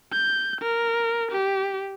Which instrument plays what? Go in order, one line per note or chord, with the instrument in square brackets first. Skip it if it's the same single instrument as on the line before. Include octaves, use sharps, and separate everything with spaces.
[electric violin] G6
A#4
G4